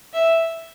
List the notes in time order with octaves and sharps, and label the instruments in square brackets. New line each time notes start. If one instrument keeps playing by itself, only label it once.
[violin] E5